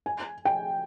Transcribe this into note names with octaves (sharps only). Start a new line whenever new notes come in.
G#5
G5